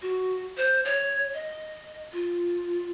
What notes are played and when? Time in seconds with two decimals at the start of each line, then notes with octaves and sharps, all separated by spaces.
0.02 F#4
0.57 C5
0.85 C#5
1.34 D#5
2.13 F4